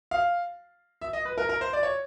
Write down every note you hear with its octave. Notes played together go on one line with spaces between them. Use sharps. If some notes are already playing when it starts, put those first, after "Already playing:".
F5
E5
D#5
B4
A#4
A#4
C5
D5
C#5